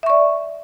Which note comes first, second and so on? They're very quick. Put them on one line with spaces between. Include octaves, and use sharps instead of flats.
E5 C#6 D5